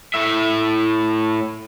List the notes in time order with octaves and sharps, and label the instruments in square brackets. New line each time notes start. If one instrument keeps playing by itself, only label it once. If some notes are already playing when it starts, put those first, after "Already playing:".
[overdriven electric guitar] A2 E5